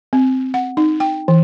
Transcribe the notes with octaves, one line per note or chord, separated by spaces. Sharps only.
C4
F#5
D#4
G5
E3